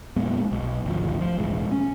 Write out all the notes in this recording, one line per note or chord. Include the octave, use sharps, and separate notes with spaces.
F2 A#2 G#3 B3
B1
G#1 D2 F3
F3
E1 A1 G#3
C#4